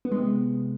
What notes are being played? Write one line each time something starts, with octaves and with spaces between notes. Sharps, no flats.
B3
G#3
C3